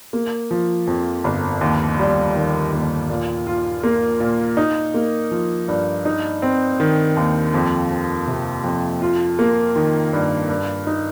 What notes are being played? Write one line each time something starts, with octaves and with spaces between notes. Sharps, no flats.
A#3
F3
F2
G1
D#2
G3
D#3
D#2
A#2
F4
A#3
A#2
D#4
A#3
F3
G2
D#4
C4
D#3
D#2
F2
F3
C3
F2
F4
A#3
D#3
G2
G2
D#4